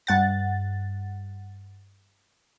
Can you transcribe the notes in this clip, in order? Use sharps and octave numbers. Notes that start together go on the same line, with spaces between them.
G2 F#5 A6